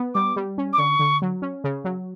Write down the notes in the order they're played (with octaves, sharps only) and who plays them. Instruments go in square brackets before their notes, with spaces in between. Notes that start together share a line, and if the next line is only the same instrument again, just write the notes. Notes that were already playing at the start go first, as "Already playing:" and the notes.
Already playing: [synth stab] B3
[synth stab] G3 [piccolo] D6
[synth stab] G3
C#4
[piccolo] D6
[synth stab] D3 [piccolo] C#6
[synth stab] D3
F#3
C#4
C#3
F#3